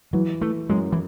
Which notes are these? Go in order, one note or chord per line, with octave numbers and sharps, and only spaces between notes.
E3 F#3
E3 A3
F#2 G#3
E3